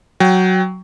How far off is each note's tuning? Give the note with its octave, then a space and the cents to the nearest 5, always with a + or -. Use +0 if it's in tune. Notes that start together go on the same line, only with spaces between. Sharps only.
F#3 +5 G5 +0